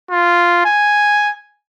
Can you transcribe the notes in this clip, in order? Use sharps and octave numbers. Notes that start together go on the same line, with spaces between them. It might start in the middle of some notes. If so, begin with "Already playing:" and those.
F4
G#5